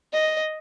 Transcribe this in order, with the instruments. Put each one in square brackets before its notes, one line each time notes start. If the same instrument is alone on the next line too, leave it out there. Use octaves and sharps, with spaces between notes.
[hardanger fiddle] D#5